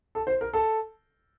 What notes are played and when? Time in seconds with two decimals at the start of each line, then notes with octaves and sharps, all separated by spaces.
0.15 A4
0.27 C5
0.41 A#4
0.53 A4